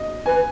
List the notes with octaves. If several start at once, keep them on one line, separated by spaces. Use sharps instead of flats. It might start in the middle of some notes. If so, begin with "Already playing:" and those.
Already playing: D#5
B4 G#5